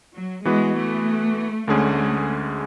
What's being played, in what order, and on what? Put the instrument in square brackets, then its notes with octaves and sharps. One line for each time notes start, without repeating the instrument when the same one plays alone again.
[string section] F#3
[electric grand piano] E3 B3 F#4 B4 [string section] G#3
[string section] A3
[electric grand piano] D2 D3 G#3 C#4 G#4 [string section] A3